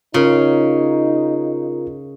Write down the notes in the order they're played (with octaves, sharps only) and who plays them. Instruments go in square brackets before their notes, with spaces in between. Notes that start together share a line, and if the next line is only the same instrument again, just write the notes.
[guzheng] C#3 [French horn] D#4 [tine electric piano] F4 A#4